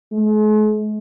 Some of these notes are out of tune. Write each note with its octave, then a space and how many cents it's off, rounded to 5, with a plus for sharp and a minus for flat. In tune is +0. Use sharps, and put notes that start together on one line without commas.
G#3 +45